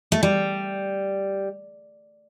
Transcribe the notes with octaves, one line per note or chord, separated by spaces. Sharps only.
A3
G3